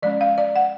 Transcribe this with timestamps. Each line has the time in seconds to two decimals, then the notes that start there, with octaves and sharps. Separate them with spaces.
0.02 F3 G#3 C#4 D5
0.21 F5
0.38 D5
0.56 F#5